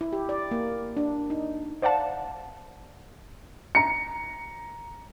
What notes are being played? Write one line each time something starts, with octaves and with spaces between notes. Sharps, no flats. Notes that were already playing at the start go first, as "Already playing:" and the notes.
E4
G4
D5
A#3
D4
D#4
C5 D5 F5 F#5 A5
A#5 C#7